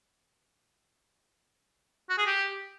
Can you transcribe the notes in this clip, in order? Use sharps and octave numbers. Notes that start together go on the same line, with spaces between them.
F#4
G#4
G4